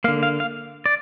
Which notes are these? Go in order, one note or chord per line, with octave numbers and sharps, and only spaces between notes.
D3 A#3 F5
F5
F5
D5